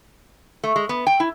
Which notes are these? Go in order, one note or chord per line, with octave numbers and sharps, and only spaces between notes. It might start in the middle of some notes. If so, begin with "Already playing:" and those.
A3
G#3
B3
G5
E4